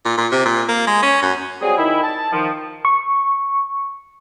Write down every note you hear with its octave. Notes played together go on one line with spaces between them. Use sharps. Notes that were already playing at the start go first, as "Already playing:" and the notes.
A#2
A#2
C3
A#2
A#3
G#3
C#4
F#2
F#3 G3 C4 G#4
D#3 E4
A5
D#3 F3
C#6